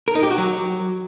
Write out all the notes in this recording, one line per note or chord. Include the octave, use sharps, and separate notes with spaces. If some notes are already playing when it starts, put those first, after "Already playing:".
A#4
D#4
G4
F#4
F#3